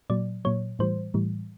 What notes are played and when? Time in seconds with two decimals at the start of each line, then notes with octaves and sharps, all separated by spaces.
0.10 A#2 F#3 D5
0.45 A#2 F#3 C#5
0.79 A2 E3 G3 C5
1.14 A2 E3 G3